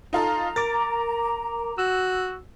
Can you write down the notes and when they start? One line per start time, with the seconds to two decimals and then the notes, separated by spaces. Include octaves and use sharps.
0.13 D#4 F4 A4 A#5
0.56 A#4 D6 A6
1.78 F#4 E6